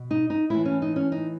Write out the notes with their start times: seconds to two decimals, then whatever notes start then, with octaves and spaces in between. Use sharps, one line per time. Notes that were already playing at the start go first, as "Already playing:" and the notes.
Already playing: B2
0.11 D#4
0.30 D#4
0.50 A2 E3 E4
0.65 C#4
0.82 D#4
0.96 C#4
1.12 D#4